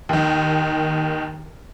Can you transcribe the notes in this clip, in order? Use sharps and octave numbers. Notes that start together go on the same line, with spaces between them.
D#2 D#3